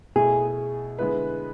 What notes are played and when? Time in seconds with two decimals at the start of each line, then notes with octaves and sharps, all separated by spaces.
0.16 B2 A3 E4 G#4
0.99 D3 G#3 B3 E4 B4